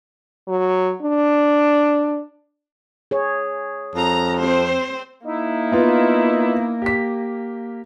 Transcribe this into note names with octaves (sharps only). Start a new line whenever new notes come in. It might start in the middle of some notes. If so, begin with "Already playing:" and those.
F#3
D4
G#4 C#5
F2 A#5
C4 C5
A#3 D#4 E4
B3 F4
G4 B6